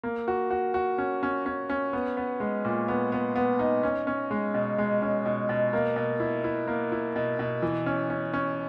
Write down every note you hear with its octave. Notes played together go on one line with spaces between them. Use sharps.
A#3
F#4
F#4
F#4
C#4
C#4
C#4
C#4
B3
B3
G#3
A#2
B3
B3
B3
D#4
C#4
C#4
G#3
B2
G#3
C#4
B2
B2
A#3
B2
E4
E4
A#3
E4
B2
B2
E3
C#4
C#4
C#4